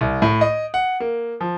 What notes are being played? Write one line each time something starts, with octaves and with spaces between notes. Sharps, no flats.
C2
A2
D#5
F#5
A#3
F3